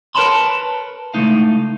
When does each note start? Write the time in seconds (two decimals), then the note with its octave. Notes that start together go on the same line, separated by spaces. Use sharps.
0.15 A#4 B4 C#5 A5 B5 C6
1.14 C#2 A2 G#3 A3 D#4 F5